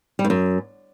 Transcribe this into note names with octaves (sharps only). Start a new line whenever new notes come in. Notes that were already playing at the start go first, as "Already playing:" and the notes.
G3
G2
F#2